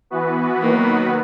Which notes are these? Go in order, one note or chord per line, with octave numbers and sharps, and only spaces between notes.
E3 B3 F#4 B4
D#3 F#3 A#3 B3 F#4 B4